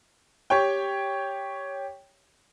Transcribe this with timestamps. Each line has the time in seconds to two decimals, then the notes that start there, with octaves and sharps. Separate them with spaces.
0.50 G4 C#5 G5